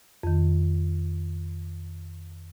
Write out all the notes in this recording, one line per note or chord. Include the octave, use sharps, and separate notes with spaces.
F2 D#3